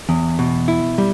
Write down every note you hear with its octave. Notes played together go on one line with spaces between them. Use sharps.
E2
B2
E4
G3